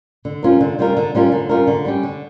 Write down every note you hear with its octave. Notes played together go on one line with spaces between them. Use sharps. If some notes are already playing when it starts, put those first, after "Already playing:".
D3
G3 C#4 F4 A#4
D3
G3 C#4 F4 A#4
D3
G3 C#4 F4 A#4
D3
G3 C#4 F4 A#4
D3
G3 C#4 G4
D3